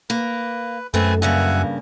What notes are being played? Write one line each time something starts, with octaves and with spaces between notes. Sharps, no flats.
A#3 B4
F#2 A3 C4 B4 G#5
G2 C#3 A#3 E5 F#5 G#5